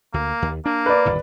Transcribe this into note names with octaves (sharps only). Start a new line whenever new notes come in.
D2 A#3
D#2
A#3 D4
B4 D5
G1 D#2 A2